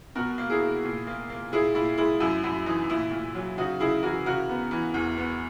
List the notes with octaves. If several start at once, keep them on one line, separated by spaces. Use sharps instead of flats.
B2 F#4 A#4
A#3
E4 G#4
A#3
A#2
A#3
A#3
A#2 E4 G#4
A#2 E4
G#3 E4
F#2 E4
F#2 E4
E3 D#4
A#2 E4
A#2
F#3
C#3 D#4 F#4
C#3 E4 G#4
E3 F#4 A#4
C#3 F#4 A#4
B3
E3
E2
B3